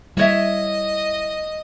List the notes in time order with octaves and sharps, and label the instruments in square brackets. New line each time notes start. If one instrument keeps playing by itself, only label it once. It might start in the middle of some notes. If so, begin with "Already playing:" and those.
[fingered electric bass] G3 [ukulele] E4 C#5 E5 [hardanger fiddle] D#5